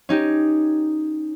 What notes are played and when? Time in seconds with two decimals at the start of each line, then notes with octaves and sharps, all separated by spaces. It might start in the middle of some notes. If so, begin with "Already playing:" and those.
0.09 C#4 D#4 G4